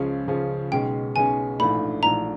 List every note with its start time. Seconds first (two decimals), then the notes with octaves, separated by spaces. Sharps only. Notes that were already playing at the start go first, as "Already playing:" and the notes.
Already playing: C#2 C#3 F3 G#3 C#4
0.27 C#2 C#3 F3 G#3 C#4
0.72 B1 B2 G#3 C#4 G5
1.16 B1 B2 G#3 C#4 G#5
1.59 A#1 G#2 E3 A3 D4 B5
2.03 A#1 G#2 E3 A3 D4 A#5